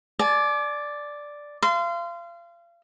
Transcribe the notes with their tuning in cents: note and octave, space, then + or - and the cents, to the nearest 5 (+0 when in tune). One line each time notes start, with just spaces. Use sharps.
D5 +0 G#5 +45
F5 -35 C6 -25